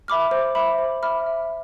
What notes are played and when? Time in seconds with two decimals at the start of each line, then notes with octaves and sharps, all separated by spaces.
0.08 E5 B5 D6 F6
0.31 C5
0.55 E5 B5 D6 F6
0.78 C5
1.03 E5 B5 D6 F6
1.26 E5